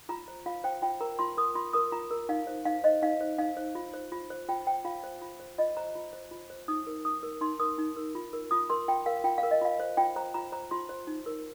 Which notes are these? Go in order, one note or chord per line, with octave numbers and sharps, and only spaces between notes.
F4 A#5
C5
F4 F5
C5 G5
F4 G5
A#4 A#5
F4 C6
A#4 D#6
F4 C6
A#4 D#6
F4 A#5
A#4
D#4 F5
C5
D#4 F5
C5 D#5
D#4 F5
C5
D#4 F5
C5
F4
C5
F4
C5
F4 G5
C5 G5
F4 F5
C5
F4
C5
F4 D#5
C5 A#5
F4
C5
F4
C5
D#4 D#6
A#4
D#4 D#6
A#4
D#4 C6
A#4 D#6
D#4
A#4
F4
A#4
F4 D#6
A#4 C6
F4 G5
A#4 F5
F4 G5
F5
A#4
D#5
F4 F5
C5
F4 G5
C5 A#5
F4 A#5
C5 A#5
F4 C6
C5
D#4
A#4